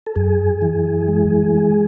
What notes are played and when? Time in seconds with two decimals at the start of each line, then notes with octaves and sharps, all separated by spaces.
0.06 A4
0.16 F#2 G#4
0.62 E3
1.08 G#3
1.55 G#3